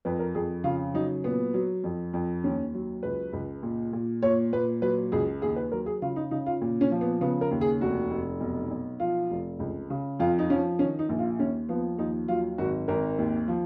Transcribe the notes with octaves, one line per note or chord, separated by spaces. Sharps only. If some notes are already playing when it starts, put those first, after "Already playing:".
F2 B4
A#4
F2 G#4
C#3 F4
F#3 D#4
A#2 B3
F#3
F2
F2
D#2 C#4
F#3
C#2 B4
C#2
A#2
A#2
A#2 C#5
A#2 B4
F#3 B4
C#2 G#4
D#2 G#4
B4
F#3 A#4
G#4
C#3 F4
D#4
C#3 D#4
F4
A#2
C#4
F3
B3
C#3 B3
A#4
D#2
G#4
F1 F#4
F1
B1
B1
F3 F4
F1
C#2
C#3
F2 F4
D#4
F3 C#4
D#3 C#4
D#4
A#1
F4
D#2 C#4
F3 B3
D#2 D#4
F#3 F4
G#1 F#4
G#1 A#4
D#2
F3